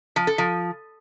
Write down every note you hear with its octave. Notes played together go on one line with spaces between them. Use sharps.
F3
A4
F3